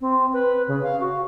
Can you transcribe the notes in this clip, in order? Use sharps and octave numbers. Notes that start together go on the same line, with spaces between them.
C4
B4
C#3
F5
F#4